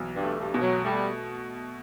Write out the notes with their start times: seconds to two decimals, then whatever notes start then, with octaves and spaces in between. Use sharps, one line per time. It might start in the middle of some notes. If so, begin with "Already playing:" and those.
Already playing: B1 E3
0.16 G2
0.23 A3
0.39 G2
0.54 B2
0.62 F#3
0.85 G3 A3